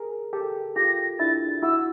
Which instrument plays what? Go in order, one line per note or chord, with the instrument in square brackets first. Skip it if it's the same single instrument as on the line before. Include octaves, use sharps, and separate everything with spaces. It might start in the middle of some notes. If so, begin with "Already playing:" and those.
Already playing: [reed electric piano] G#4 A#4
G4 A4
[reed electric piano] F4 G4 [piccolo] A#6
[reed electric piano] D4 E4 [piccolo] A6
[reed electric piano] E4 F#4 [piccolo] E6